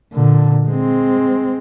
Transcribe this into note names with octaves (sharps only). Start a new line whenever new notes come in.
A#2 D3
G#3 C4